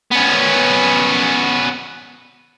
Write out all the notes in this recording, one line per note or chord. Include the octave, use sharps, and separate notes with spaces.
B3 C#4